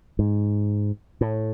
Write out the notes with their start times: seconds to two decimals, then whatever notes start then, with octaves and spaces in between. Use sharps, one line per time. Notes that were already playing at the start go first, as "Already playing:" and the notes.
0.19 G#2
1.21 A2